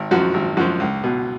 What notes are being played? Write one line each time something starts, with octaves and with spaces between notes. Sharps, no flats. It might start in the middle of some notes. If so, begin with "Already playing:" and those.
Already playing: G#1
F#2 F3 F#4
G#1
F#2 F3 F#4
C#2
B2